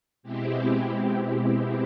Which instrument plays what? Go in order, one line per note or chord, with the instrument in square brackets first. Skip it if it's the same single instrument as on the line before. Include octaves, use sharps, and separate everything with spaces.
[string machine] B2 G#3 C4 E4 G4